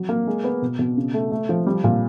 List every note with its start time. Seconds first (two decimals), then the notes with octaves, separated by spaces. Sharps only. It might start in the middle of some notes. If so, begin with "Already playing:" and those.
Already playing: F#3
0.09 A#3
0.27 G#3
0.44 B3
0.62 B2
0.79 B2
0.97 C#3
1.14 A3
1.32 A3
1.49 F3
1.67 G3
1.84 A#2